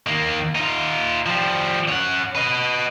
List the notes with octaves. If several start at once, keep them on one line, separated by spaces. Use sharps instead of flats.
D#3 A#3
D#4 F4
F3 G3
C#4 F#5
B4 D#5